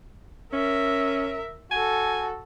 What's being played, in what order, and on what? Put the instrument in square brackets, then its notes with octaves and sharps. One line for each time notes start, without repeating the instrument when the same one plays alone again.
[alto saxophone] C#4 [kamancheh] A#4 E5
[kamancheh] F#4 A4 [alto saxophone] G#5